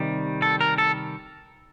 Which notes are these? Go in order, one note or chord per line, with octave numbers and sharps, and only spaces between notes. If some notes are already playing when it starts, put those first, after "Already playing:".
Already playing: C3 D#3 G3
A4
A#4
A4